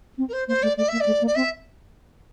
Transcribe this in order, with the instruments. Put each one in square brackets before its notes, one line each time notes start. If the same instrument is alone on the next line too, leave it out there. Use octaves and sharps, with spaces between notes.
[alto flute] C4
[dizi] A#4
C5
[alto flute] A#3 [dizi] C5
[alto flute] A3 [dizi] D5
[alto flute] A3 [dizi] D5
[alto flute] A#3 [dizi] E5
[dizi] D5
[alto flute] A3
A#3
[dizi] D5
[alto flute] C4 [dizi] E5